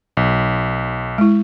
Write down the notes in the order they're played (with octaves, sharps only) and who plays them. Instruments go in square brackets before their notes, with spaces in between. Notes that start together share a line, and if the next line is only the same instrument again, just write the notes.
[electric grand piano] B1
[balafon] G#3 E4